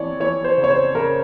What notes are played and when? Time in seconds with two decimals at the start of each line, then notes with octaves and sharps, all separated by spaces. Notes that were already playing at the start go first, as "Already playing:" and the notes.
Already playing: F2 E3 C#5 D5
0.20 E3 C#5
0.44 C5
0.57 C#3
0.64 C#5
0.70 C5
0.95 C#3 A#4